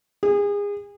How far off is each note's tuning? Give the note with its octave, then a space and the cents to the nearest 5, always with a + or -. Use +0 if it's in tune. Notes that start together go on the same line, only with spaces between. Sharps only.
G#4 -30